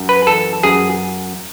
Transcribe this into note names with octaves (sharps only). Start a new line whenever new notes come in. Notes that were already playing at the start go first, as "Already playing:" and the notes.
Already playing: F#2
B4
E3 A4
F#2 G#4